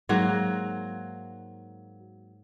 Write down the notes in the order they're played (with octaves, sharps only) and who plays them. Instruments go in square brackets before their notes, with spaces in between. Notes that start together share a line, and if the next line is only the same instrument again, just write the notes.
[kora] G#2 F#3 A#3 F#4